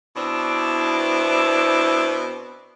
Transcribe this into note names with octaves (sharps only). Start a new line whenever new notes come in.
B2 C4 D4 E4